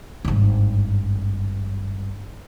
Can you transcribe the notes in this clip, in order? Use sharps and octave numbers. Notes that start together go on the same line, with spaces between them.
G#1 G2